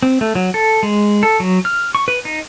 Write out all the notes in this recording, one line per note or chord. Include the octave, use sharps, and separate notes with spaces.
C4
A3
F#3
A4
G#3
A4
F#3
F6
C#6
B4
D#4